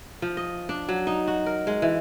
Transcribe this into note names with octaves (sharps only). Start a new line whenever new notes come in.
F3
D#5
D4
F#3
D#4
F#4
A#4
G#3
E3